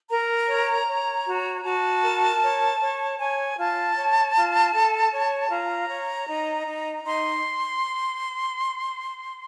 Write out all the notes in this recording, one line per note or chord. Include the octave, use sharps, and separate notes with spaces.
A#4 A#5
C#5
C#5
F#4
F#4 A5
A#4
C#5
C#5
C#5 G#5
F4 A5
C#5
F4
A4
C#5
F4 A#5
C#5
D#4
D#4
D#4 C6